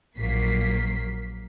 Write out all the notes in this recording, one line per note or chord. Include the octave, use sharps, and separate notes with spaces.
A#1 F3 F#3 A#3 B6 C7